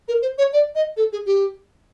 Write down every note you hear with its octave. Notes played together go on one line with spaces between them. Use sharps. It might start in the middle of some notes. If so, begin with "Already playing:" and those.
A#4
C5
C#5
D5
D#5
A4
G#4
G4